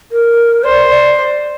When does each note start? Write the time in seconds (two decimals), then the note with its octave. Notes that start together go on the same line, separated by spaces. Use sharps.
0.12 A#4
0.64 C5 D5
0.91 D5